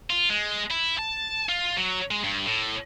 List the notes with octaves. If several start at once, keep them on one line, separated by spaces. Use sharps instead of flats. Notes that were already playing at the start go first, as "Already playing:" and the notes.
F4
G#3
E4
A5
F4
F#3
G#3
G2
A2